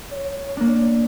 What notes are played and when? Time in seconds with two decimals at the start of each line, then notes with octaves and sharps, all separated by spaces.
0.13 C#5
0.57 A#3 D4